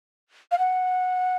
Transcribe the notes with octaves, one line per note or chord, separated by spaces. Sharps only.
F5
F#5